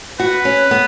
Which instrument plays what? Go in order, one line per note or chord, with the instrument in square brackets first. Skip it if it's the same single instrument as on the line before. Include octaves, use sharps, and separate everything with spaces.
[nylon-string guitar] F#4 [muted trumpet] B4
[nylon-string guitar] C#4
B3